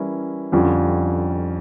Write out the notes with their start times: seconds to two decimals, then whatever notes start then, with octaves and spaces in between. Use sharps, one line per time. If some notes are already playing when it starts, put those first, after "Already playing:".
Already playing: E3 G3 C#4 E4 A#4
0.52 F2 D3 G3 C#4 F4